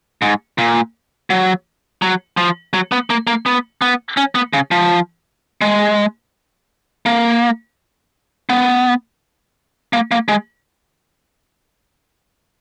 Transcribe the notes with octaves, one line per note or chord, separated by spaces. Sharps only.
G#2
A#2
F#3
F#3
F3
F#3
B3
A#3
A#3
B3
B3
C#4
B3
C#3
F3
G#3
A#3
B3
A#3
A#3
G#3